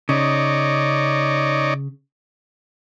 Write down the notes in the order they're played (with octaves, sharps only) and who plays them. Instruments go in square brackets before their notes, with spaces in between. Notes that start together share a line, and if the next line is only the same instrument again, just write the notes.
[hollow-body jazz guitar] C#3 [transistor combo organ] D#4 C#5 D5